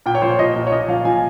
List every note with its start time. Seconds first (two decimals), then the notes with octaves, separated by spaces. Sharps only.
0.06 A#2 G5
0.15 C#5
0.22 F3 C5
0.31 C#5
0.39 F3 D#5
0.56 A#2
0.67 C#5
0.72 A#2 D#5
0.88 F3 F5
1.05 F3 G#5